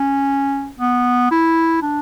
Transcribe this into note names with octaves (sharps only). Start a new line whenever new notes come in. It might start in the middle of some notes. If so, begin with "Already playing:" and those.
Already playing: C#4
B3
E4
D4